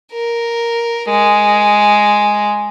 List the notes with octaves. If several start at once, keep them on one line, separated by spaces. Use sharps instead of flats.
A#4
G#3